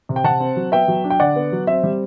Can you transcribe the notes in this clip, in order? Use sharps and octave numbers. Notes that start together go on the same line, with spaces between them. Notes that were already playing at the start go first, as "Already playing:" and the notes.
C3
G5
C3 F#5 A5
C4
F#3
B3 E5 G5
F#3
D4
G5
D3 D5 F#5
B3
F#3
C4 E5
G3